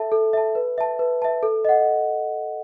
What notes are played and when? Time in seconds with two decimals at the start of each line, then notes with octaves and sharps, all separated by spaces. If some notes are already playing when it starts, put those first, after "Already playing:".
Already playing: A4 E5 A5
0.12 A4
0.33 E5 A5
0.55 B4
0.78 E5 A5
0.99 B4
1.22 E5 A5
1.43 A4
1.65 D#5 F#5